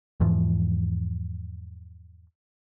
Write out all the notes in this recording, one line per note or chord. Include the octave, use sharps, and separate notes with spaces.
E2 G#2 E3 F3